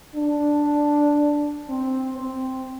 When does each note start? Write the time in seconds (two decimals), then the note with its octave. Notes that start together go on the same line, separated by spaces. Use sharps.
0.15 D4
1.68 C4
2.19 C4